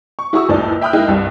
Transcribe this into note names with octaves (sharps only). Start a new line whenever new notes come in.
C#6
E4 F#4 G#4 C#6 D#6 E6
F#1 C#2 A2 D#4 D5 A5
E5 G5 B5 D#6 F6 F#6
G#3 A#3 D#4 E4 D#5 G5
C2 G2